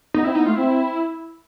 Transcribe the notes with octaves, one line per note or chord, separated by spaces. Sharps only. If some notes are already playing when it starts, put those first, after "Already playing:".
B3 D#4
C4 E4
B3 D#4
A3 F4
C4 E4